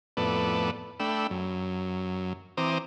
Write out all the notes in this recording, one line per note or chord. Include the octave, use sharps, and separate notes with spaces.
F2 A2 B3 A4 B4 D5
A3 D4 G5 B5 E6
F#2
E3 C4 C5 A#5 D6 D#6